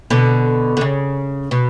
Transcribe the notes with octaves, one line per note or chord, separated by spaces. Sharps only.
B2 D3
D3
C#3
B2